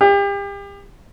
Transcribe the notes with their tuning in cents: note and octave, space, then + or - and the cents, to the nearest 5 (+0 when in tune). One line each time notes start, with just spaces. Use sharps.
G4 +35